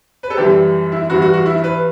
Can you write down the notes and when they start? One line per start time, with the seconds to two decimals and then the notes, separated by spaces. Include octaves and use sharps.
0.23 B4
0.30 A4
0.37 F#2 E3 G3 G4
0.92 E4
1.10 G2 E3 G3 F#4
1.22 F#4
1.34 F#4
1.46 E4
1.64 B4